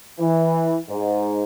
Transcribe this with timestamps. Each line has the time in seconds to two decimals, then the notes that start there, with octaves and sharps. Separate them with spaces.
0.20 E3
0.89 G#2